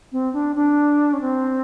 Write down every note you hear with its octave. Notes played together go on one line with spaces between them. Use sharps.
C4
D4
D4
C#4
C4